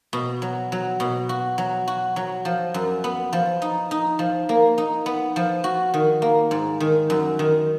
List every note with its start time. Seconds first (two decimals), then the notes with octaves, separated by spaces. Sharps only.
0.13 B2
0.42 F#3
0.72 F#3
1.00 B2
1.29 F#4
1.58 F#3
1.88 F#4
2.16 F#3
2.45 F3
2.74 F#2
3.04 B3
3.33 F3
3.62 D#4
3.91 D#4
4.19 F3
4.49 A#3
4.78 D#4
5.06 B3
5.36 F3
5.64 F#4
5.94 D#3
6.22 A#3
6.51 G#2
6.80 D#3
7.10 F#2
7.39 D#3